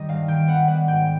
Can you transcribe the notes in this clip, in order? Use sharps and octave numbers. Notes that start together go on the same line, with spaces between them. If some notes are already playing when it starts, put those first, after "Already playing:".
Already playing: D#3 G3 D#5
G2 F5
D#3 G5
B3 F#5
G3 F#5
G#2 G5